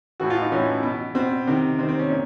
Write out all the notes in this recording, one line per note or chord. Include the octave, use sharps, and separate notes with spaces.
A2 E3 F#4
F4
D#4
A2 E3 C#4
B2
B2 C4
C3 D#3
C3 D#3 C4
C4
C#4
A#2